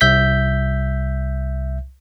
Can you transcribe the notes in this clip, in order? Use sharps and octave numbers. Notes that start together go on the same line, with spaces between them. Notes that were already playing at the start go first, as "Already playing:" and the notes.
C2 E5 G6 B6